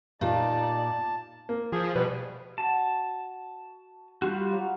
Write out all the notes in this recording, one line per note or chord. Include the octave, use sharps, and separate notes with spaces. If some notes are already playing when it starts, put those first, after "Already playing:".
A#2 D#4 G4 D5 F5 A5
A#3
F3 G#4
B2 G3 B4
F#4 A5
G3 F4 F#4
F#3 F5 F#5